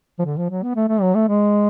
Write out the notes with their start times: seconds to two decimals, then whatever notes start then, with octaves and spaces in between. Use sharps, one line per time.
0.19 F3
0.25 D3
0.37 F3
0.50 F#3
0.63 B3
0.76 A3
0.88 A3
1.01 F#3
1.15 A3
1.28 G#3